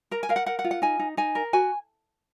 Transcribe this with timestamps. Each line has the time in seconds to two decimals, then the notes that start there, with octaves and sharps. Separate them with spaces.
0.11 A#4 A#5
0.23 G#5
0.29 A#4 F5
0.36 F#5
0.46 A#4 F#5
0.59 F#5
0.64 F4
0.71 F#5
0.82 D#4 G#5
0.99 D#4
1.17 D#4 G#5
1.35 A#4
1.53 F#4 G#5